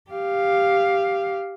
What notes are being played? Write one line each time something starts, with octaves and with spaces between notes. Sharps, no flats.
G4 F5